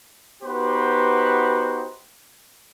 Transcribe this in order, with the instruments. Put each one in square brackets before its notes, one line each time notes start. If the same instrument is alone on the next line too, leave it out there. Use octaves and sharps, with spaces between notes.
[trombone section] B3 D#4 F#4 G4 B4 C5